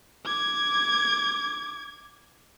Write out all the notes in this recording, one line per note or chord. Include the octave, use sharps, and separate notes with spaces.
D6 G#6